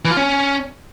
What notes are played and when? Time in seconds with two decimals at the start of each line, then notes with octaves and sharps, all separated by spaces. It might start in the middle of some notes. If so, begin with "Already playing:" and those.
0.05 E3
0.11 F4
0.17 C#4